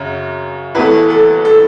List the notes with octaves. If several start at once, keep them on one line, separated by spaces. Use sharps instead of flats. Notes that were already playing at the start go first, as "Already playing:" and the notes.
Already playing: F#2 C#3
E2 E3 A3 B4
A4
A4